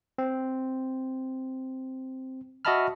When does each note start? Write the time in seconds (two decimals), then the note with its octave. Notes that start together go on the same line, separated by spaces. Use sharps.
0.18 C4
2.65 F#4 D#5 E5 A5 B5 F6